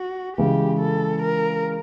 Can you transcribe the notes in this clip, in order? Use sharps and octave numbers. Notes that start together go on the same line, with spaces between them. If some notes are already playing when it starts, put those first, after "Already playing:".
Already playing: F#4
C#3 E3 G#3 G4
A4
A#4